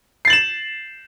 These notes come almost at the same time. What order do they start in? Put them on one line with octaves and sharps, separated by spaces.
C7 A6 F#7 E7